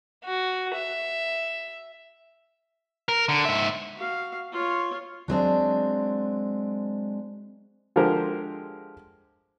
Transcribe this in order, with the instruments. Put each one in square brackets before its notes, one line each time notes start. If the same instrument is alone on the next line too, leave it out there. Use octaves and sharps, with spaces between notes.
[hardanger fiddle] F#4
E5
[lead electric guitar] A#4
D3
G#2 E5
[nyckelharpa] F#4 F5
F4 C#5
[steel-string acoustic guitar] F#3 G#3 C4 D4
[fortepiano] D3 F3 G#3 G4 A#4 C5